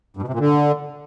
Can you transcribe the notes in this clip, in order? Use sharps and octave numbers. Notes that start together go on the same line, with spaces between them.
G2
B2
C3
A#2
D3